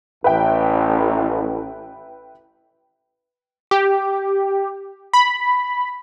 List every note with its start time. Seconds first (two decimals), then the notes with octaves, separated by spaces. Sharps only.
0.24 A1 B4 E5 G5
3.71 G4
5.13 B5